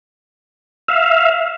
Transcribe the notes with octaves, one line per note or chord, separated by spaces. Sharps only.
E5 F5